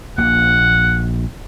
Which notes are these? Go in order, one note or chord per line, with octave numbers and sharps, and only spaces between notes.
A#1 A#3 F#5